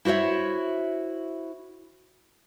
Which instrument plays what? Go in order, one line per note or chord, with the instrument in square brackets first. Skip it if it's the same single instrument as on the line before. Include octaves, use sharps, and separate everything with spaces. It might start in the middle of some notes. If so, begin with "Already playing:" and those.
[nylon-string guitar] E4 F#4 C5 C#5 E5